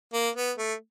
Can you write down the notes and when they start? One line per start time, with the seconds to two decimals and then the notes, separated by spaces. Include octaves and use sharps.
0.13 A#3
0.36 B3
0.58 A3